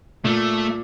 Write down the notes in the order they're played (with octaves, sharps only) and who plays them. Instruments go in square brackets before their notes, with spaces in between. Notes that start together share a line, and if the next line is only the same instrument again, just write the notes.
[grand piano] A#2 [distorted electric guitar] A3